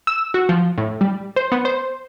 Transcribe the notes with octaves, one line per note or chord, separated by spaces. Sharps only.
E6
F#4
F3
A2
G3
C5
B3
C5